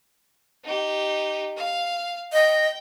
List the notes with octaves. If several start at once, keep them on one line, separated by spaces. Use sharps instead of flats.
D#4 G4
F5
D#5 G5